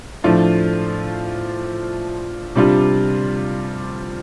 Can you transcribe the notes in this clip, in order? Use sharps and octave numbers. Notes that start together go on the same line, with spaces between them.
A2 F3 A3 D4 F4
C3 G3 D4 F4